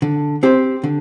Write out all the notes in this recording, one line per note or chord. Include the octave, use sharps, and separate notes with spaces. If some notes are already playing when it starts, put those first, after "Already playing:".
D3
C4 G4 C5
D3